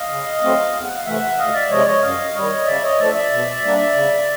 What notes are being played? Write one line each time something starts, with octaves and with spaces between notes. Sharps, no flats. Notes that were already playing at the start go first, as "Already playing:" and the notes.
Already playing: D#5 F5
C#3
F#3 A3 C4
E2
F#5
F5
C3 E3 A3 E5 F#5
D2 D#5 F5
D5 E5
C3 F3 G#3 C#5 D#5
D5
C#5 D#5
F#2 D#5 F5
D#3 G3 C#5 D#5
C#3 D5 E5
C#5 D#5
F3 A3 D4 D5 E5
D5 E5
B2
G3 A#3 D4
C#3